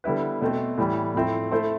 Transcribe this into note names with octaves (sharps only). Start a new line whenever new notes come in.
D3 G3 B3 E4 B4
B2 A3 C4
A2 E3 G3
A2 F3 A3 C4 E4
A3 E4 A4 C5